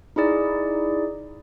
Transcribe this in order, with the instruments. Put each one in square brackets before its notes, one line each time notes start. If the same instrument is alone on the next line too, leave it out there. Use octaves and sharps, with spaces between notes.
[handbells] D#4 E4 G#4 D5